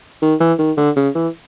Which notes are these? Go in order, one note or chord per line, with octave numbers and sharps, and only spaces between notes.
D#3
E3
D#3
D3
C#3
E3